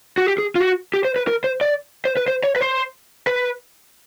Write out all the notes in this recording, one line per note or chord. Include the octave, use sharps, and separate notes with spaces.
F#4
G4
G#4
F4
F#4
G4
C5
B4
A#4
C5
D5
C5
B4
C5
C#5
B4
C5
B4